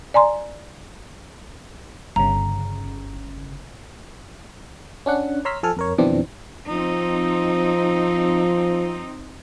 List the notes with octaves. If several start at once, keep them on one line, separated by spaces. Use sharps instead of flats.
D5 G#5 A#5 C6
G1 C#3 A#5
C#4 D4 F#5
C#5 A#5 C6 E6 F6 B6
F3 A4 G#5 F6
F2 A#4 C#5
F2 B2 D#3 E3 C4 D4
F3 C4 D#4